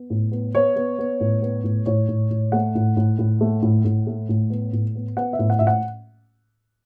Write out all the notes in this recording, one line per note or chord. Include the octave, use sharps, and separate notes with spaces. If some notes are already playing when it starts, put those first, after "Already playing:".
Already playing: B3
A2
B3
B3 C#5
B3
B3
A2
B3
A2
A2 C#5
A2
A2
A3 F#5
A2
A2
A2
A3
A2
A2
A3
A2
B3
A2
B3
B3 F#5
E5
A2
F#5
A2 E5
F#5